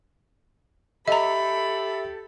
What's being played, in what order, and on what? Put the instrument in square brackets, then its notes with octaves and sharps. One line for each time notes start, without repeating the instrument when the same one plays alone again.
[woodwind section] G4 A4 [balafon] D#5 A#5 [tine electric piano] E5 [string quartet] B5